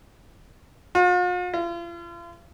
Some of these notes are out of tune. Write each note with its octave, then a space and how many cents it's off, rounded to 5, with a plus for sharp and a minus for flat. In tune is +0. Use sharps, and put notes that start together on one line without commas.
F4 +45
F4 -40